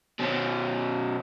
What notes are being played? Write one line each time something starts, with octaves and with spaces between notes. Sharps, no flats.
B2 C#4